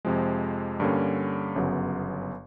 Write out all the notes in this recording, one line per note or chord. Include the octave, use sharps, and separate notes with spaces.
F2 C3 F3 G#3
G2 D3 G3 A#3 C#4
G1 F#2 C#3 F#3 B3